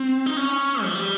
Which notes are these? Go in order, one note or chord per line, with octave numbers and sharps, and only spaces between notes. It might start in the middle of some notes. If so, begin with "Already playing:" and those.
Already playing: C4
D#4
C#4
F3
G3